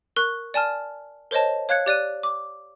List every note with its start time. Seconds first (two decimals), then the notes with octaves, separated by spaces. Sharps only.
0.16 A#4 C#6 F#6
0.54 D5 G#5 A5 F6
1.31 A#4 C5 C#5 D#5 A5
1.69 C#5 F5 F#6 G#6 C#7
1.86 G4 D5 F#6 D#7
2.23 D6